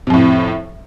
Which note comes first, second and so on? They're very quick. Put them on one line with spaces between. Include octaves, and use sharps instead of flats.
C3 F2 A2